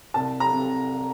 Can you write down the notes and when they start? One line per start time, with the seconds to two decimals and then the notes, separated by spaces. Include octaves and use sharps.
0.14 C2 A5
0.40 A#5
0.53 C3